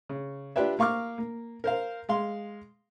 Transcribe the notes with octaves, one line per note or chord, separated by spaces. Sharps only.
C#3
D4 F4 G4 B4 D5 E5
A#3 F5 C#6 D6 F6
A#3
A#4 C5 F5
G#3 F5 C6